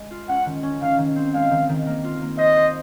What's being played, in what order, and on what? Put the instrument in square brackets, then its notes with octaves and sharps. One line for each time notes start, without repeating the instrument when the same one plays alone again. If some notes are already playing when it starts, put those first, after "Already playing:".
Already playing: [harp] G#3
F4
[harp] C#4 [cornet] F#5
[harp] D#3
C#4
[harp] D#3 [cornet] F5
[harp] D#3
C4
[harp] G#3 [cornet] F5
[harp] D#3
D#3
A#3
F4
A#3
[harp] C5 [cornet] D#5
[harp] C5